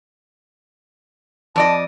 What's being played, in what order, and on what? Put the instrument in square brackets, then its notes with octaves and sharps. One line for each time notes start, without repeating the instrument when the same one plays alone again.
[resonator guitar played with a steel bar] F2 D5 D#5 [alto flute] A5